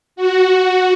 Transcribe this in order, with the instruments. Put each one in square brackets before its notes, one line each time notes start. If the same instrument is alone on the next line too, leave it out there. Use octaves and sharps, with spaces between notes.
[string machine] F#4